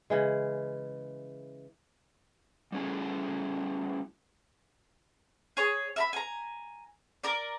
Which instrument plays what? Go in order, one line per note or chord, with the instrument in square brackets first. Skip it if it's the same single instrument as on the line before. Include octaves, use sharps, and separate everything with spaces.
[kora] C#3 E3 G#3
[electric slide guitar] G3 A3 C#4 E4 G#4 G#5
[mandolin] G#4 C#5
E5 A#5 B5
G#5 A#5
A#4 D5